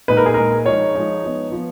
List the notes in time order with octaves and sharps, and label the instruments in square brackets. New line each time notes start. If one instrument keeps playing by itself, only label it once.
[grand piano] A#2 G#3 D#4 B4
A#4
G#4
A#2 G#3 D#4 A#4
F3 G#3 D#4 C#5
F3 G#3 D#4
F3 B3 D#4
F3 B3